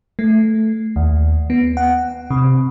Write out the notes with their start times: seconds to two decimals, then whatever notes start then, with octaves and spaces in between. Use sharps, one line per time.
0.19 A3
0.96 D#2
1.50 B3
1.77 F#5
2.30 C3